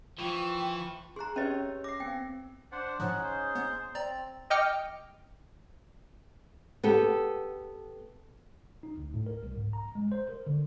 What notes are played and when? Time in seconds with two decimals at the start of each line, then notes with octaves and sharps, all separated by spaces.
0.19 E3 F3 G5 C#6
1.16 G#4 A#5 C6 F#6
1.36 C#4 G4 B4 C#5 D#5 E5
1.84 D6 A#6 C7
2.00 B3 C4 G5
2.72 D4 C5 F#5
3.00 A2 F3 C#4 D#4 G#4 F#5
3.23 C5
3.55 B3
3.95 C4 D5 A#5 A6
4.50 D#5 G5 D6 F6 C#7
6.83 B3 G4 A4
8.83 D#4
8.97 D2
9.14 A2
9.26 A#4
9.43 C2
9.56 G#2
9.73 A#5
9.95 G#3
10.12 C5
10.29 A#4
10.47 D3